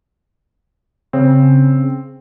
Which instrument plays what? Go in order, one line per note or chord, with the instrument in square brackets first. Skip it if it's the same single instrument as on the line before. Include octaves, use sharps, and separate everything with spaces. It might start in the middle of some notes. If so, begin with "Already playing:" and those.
[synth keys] C#3 [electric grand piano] C4